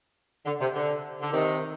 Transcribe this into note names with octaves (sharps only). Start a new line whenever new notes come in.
D3
C3
D3
D3
C3 D#3